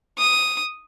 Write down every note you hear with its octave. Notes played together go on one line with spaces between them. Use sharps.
D#6